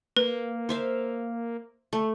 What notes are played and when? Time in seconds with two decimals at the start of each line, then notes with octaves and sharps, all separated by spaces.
0.17 A#3 B4
0.69 C5 E5 F5
1.93 A3